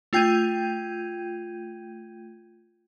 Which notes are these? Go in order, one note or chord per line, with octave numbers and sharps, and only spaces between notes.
A3 F4 G5 G6 G#6 D#7